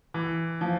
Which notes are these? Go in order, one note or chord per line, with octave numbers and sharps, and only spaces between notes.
E3
F3